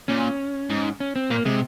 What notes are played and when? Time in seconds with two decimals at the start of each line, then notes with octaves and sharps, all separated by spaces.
0.08 A#2 C#4
0.70 G#2
1.00 C#4
1.16 C4
1.30 A#2 A#3
1.45 C3 G#3